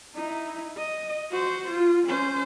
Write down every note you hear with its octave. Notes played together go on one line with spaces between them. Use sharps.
D#4 E4
D#5
F#4 C5
F4
C#4 C5